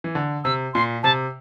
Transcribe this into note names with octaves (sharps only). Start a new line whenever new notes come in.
E3
D3
C3 E6
A#2 C6
C3 A5